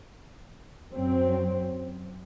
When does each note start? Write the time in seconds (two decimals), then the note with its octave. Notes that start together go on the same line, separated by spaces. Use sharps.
0.91 F#2 F#3 C4